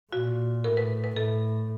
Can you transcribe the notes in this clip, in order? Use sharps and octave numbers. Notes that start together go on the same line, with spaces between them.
A#2 F#4
A2 A#4
B4
B4
A2 A4